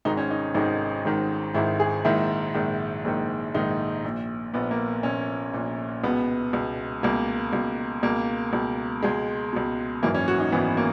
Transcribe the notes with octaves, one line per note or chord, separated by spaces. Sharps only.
G#1 G#2 D#3 D#4
C#4
D#4
G#1 G#2 D#3 D#4
G#1 G#2 D#3
G#1 G#2 D#3 E4
G#4
A#1 G#2 D#3 E4
A#1 G#2 D#3
A#1 G#2 D#3
A#1 G#2 D#3 D#4
A#1 A#2
A#1 A#2 B3
A#3
A#1 A#2 C#4
A#1 A#2
C#2 B2 B3
C#2 B2
C#2 B2 A#3
C#2 B2
C#2 B2 A#3
C#2 B2
C#2 B2 G#3
C#2 B2
G#1 F#2 E3 A#3
C#4
F#4
D#4
G#1 F#2 E3 B3
A#3